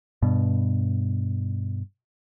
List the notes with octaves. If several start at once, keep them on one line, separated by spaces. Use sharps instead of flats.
G2 B2